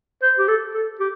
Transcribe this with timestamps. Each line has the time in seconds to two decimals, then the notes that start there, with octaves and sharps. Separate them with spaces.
0.22 C5
0.38 G4
0.48 A4
0.74 A4
1.00 G4